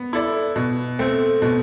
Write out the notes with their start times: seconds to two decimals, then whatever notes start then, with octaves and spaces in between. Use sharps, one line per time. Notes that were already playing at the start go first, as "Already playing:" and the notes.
Already playing: B3
0.13 E4 A4 D5
0.56 B2
0.99 A3 C4
1.42 B2